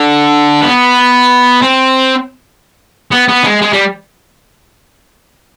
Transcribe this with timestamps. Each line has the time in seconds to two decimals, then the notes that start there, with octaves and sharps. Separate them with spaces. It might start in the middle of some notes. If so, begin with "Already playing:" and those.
Already playing: D3
0.62 B3
1.62 C4
3.11 B3
3.28 B3
3.44 G#3
3.61 G#3
3.73 G3